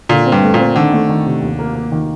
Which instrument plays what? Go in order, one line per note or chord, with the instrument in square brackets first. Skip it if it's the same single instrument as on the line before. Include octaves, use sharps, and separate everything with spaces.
[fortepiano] A#2 [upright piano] D3
[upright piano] C4
[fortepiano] G2
[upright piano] A3
[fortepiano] A#2
[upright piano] C4
[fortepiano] D3 [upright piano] D#3
[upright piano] A3
D#3
C3
D#2
A#3
A#3
D#3